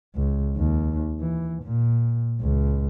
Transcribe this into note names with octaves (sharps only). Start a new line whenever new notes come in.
C#2
D#2
E3
A#2
C#2